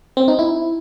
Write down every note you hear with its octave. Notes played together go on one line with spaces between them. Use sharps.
C4
D#4
E4